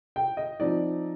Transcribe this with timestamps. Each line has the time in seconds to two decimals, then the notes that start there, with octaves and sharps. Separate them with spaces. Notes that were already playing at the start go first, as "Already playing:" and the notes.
0.16 G5
0.37 D#5
0.60 F3 C4 D#4 D5